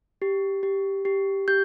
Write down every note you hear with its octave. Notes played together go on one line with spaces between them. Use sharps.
G4
G4
G4
G4 G6